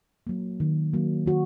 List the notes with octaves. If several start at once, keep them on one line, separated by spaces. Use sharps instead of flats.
F#3 A#3
D#3
F#3 A#3
D#3 F#4